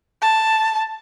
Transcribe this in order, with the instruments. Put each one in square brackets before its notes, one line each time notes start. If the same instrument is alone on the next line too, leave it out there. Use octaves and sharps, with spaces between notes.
[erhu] A5